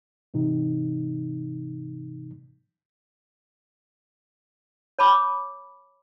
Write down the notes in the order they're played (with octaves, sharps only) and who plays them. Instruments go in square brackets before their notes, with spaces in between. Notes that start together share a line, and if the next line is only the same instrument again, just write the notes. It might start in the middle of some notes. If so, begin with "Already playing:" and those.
[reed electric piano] G#2 C3 E3 D#4
[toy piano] C#5 A5 B5 D6